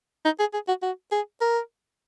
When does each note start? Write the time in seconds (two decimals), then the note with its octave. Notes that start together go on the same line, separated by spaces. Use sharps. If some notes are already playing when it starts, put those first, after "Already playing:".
0.25 D#4
0.39 G#4
0.53 G#4
0.68 F#4
0.82 F#4
1.12 G#4
1.41 A#4